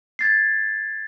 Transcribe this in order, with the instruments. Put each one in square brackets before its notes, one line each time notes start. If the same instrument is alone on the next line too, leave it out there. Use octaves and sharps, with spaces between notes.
[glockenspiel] G#6 A6 C7